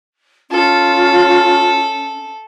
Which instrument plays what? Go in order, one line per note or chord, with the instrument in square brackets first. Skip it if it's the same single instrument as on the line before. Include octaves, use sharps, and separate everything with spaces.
[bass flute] C#4 [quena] F4 [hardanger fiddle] A4